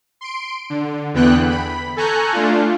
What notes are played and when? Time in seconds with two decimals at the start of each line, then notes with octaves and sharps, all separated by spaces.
0.21 C6 D7
0.70 D3
1.14 E2 D3 E3 B3 G5 F#6
1.50 B5
1.97 A4 G#5 A#5 C#6 F#6 G6
2.33 A3 D4 F4